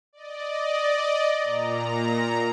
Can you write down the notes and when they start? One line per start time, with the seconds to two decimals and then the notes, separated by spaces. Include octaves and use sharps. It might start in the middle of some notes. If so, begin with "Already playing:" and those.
0.13 D5 D#5
1.43 A#2 A#5